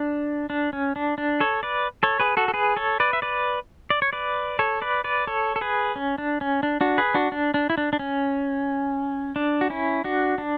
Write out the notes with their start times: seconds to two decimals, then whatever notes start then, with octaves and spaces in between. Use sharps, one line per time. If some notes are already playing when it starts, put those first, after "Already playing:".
Already playing: D4
0.50 D4
0.73 C#4
0.96 D4
1.18 D4
1.40 A4 C#5
1.63 B4 D5
2.03 A4 C#5
2.20 G#4 B4
2.37 F#4 A4
2.48 A4
2.54 G#4 B4
2.76 A4 C#5
3.00 B4 D5
3.13 E5
3.22 B4 D5
3.90 D5
4.02 C#5
4.13 B4 D5
4.59 A4 C#5
4.82 B4 D5
5.04 B4 D5
5.27 A4 C#5
5.56 A4
5.61 G#4 B4
5.96 C#4
6.18 D4
6.41 C#4
6.63 D4
6.81 D4 F#4
6.98 G#4 B4
7.14 D4 F#4
7.32 D4
7.54 D4
7.70 E4
7.78 D4
7.93 D4
7.99 C#4
9.36 D4
9.61 F#4
9.70 C#4 E4
10.04 D4 F#4
10.38 D4